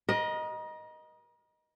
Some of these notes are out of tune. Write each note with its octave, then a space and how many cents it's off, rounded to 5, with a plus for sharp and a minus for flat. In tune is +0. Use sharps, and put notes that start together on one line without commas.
A#4 +40 D#5 +0